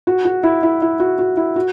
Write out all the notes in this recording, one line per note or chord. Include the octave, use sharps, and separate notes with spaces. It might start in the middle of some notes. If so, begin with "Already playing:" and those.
F#4
F#4
E4
E4
E4
F#4
F#4
E4
F#4